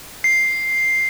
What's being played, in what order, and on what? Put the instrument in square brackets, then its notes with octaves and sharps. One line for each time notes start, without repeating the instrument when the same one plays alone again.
[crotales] C7